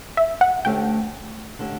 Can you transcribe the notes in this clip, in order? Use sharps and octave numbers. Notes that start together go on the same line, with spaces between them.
E5
F#5
D2 D3 A3 C#4 G4 G5
D3 A3 C#4 G4